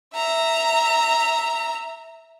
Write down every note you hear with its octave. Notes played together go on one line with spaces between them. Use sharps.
E5 A#5